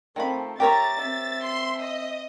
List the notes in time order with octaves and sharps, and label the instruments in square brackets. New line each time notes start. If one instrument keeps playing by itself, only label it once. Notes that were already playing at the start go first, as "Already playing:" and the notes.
[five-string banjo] D#3 F3 B5 [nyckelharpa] A3 C4
[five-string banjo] G4 A#4 C#5 [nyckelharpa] E5 A#5 [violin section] A6
[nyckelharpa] C4 E5
[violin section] C6
D#5